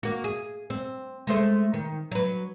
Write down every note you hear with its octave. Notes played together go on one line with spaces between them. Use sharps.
A#3 F#4
G#4
C4
G#3 A3 C5
D#3
F#3 B4